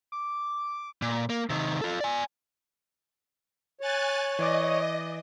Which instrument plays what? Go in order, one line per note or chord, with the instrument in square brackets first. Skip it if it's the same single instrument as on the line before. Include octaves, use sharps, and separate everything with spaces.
[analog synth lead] D6
[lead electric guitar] A#2
A#3
C3 D#3
F4 A4
D5 G#5
[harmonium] C#5 [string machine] G#5 F#6 A6
[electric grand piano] E3 D5 D6 [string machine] D#5